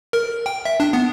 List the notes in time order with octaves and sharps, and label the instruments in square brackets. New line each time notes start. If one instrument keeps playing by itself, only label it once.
[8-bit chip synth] A#4
G5
E5
D4
B3